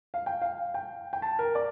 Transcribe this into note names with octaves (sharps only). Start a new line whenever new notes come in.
F5
G5
F5
G5
G5
A5
A#4
D5